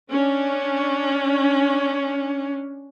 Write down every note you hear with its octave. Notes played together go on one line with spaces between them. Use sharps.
C#4 D4